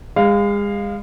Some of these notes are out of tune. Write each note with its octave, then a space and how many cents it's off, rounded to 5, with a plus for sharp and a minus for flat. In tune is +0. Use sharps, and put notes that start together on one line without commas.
G#3 -35 F5 +0